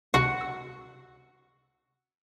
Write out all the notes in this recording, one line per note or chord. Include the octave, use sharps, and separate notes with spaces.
C#2 C3 F#4 F#5
E6